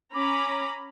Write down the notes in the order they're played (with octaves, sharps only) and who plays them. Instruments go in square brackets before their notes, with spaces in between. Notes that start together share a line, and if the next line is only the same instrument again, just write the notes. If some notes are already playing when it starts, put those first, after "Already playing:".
[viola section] C#4 A#5 B5 [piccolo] D6